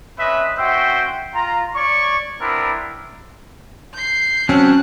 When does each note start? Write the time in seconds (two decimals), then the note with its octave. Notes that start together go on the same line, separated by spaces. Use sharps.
0.19 C4 C#4 B4 D#5 E5
0.58 C#4 F#4 C5 E5 G5
1.34 F4 A#5
1.75 C#5 D5 C#6
2.41 B3 C4 D4 E4 A#4
3.94 G6 C7
4.49 F#3 C4 C#4 A5 F#6